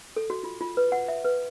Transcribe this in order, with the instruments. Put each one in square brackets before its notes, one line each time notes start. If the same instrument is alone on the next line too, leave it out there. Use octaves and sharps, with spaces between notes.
[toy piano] A4
F#4
F4
F4
B4
F#5
E5
B4